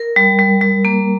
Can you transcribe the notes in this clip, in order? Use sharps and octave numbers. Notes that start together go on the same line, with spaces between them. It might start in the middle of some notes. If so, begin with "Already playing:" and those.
Already playing: A#4
G3
G3
G3
A#3